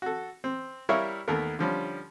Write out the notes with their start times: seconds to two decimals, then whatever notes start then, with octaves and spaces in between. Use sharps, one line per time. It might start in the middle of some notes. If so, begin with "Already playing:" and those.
0.02 F#4 A4
0.44 C4
0.89 G3 E4 A#4 C#5 E5 F5
1.28 D#2 A3 B3 A#4
1.59 D3 F3 G3 C#4